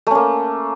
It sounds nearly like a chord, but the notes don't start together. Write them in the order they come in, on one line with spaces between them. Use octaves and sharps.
A3 C#4 A#3